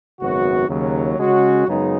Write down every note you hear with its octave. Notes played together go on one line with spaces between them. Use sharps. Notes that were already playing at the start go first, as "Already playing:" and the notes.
G#1 F#2 C#3 B3 F#4
D#2 C#3 F#3
C#3 G#3 C#4 F#4
F#2 C#3 G#3 B3 D#4